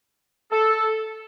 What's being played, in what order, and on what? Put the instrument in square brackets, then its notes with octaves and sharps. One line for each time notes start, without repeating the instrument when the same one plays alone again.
[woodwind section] A4